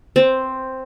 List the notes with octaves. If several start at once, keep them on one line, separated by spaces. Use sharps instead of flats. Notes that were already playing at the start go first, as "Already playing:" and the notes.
C4